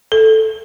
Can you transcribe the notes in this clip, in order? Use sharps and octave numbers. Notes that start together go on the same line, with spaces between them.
A4